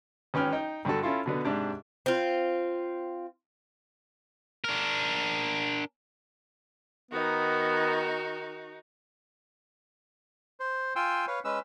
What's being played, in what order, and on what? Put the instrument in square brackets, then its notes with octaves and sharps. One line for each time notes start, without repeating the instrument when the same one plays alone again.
[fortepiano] G#1 C#4 B4 G5 F6
D#4 G5
G2 D3 D4 F#4 A4
C#4 E4 F4 A4
B2 D3 B3
G#2 C3 D4 G4
[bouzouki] C4 F4
[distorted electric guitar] D4 A#4
[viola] D#3 [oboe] B3 [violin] D#4 F#4
[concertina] C5
F4 G5 G#5 C6 E6
B4 C#5 F5
G#3 C#4 B4 E6